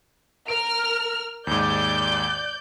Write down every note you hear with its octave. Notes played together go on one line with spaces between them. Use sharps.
A#4 F6 D7
D#2 G#2 D5 G6